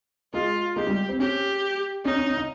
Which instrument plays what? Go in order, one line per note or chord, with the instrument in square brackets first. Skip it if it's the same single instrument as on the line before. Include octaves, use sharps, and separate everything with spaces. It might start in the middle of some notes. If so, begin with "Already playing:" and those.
[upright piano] G#3 [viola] F4
[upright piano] G#3 [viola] G4
[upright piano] G3
C4
[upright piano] C#4 [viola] G4
[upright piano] C#4 [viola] D#4
[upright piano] C#4
C#4
D#4